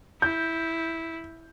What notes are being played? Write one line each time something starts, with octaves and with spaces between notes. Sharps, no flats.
E4 G6